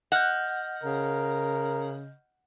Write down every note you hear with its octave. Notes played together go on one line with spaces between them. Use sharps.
D#5 F#5 F6 G6
C#3 A#4